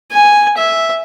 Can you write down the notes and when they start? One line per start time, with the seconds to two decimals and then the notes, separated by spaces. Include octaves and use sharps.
0.11 G#5
0.57 E5